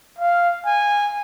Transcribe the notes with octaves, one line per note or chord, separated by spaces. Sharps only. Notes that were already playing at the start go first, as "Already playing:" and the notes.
F5
G#5